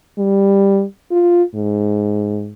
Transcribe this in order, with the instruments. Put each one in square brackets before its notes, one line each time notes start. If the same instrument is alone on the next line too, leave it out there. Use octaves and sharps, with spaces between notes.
[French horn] G3
F4
G#2